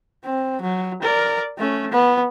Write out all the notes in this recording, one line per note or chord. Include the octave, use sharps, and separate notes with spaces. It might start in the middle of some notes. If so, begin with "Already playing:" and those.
C4
F#3
A#4 D5
A3 C#4
B3